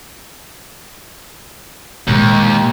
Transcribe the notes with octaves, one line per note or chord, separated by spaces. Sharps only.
D#2 A#2 G#3